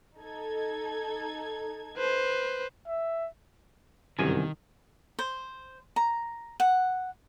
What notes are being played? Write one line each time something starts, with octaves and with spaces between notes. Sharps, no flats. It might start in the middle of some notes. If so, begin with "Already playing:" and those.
D#4 A4 G#6
B4 C5
E5
G1 C2 F#2 D#3 G#5
C5
A#5
F#5